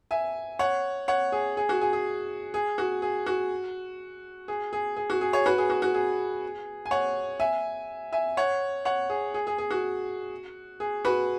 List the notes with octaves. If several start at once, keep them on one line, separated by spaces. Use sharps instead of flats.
E5 G#5
C#5 F#5
C#5 F#5
G#4
G#4
F#4
G#4
G#4
G#4
F#4
G#4
F#4
G#4
G#4
G#4
F#4
G#4
G#4 C#5
F#4 B4
G#4
F#4
F#4
G#4
G#5
C#5 F#5
E5 G#5
E5 G#5
C#5 F#5
C#5 F#5
G#4
G#4
G#4
G#4
F#4
G#4
F#4 B4